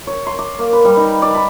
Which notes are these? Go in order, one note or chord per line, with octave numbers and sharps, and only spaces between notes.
C#5
C6
D6
A#3
B4
G3
D#4
D5
B5